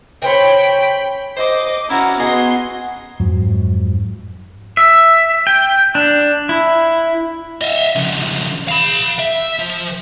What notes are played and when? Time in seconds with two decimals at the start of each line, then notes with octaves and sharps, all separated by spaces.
0.22 C#3 C5 C#5 G5 B5
1.37 C5 D#5 D6
1.90 C#4 E4 F#4 F#5 A#5 D6
2.20 B3 F#4 G#4 D#5 F#5 C6
3.20 F2 G#2 F#3
4.77 E5
5.47 G5
5.95 D4
6.49 E4
7.61 D#5 E5
7.95 F2 C#3
8.69 F5 B5
9.19 E5
9.59 F3